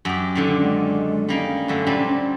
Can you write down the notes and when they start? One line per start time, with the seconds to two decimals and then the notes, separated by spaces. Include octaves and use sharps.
0.05 F#2 G4
0.35 A#2 D3 D#3 C#4
0.61 G#3
1.29 G3 A#3 C#4 D#4
1.68 F#2 D3 A3
1.87 A#2 G3 C4